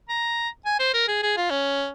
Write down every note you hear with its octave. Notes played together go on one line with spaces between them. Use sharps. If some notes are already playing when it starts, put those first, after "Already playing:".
A#5
G#5
C5
A#4
G#4
G#4
F4
C#4